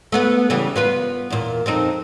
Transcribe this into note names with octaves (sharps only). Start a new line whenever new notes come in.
A3 B3 B4
C#3 E3 G3
B3 F4 B4
E2 A#2
F2 C4 D#4